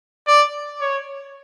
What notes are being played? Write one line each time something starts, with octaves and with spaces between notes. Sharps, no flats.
D5
C#5